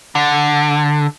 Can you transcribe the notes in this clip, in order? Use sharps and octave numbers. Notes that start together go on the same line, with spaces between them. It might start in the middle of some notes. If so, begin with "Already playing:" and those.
D3